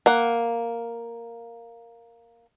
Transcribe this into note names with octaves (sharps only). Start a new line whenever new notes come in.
A#3 F#5